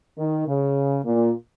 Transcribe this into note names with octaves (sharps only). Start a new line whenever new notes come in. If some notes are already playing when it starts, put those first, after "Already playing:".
D#3
C#3
A#2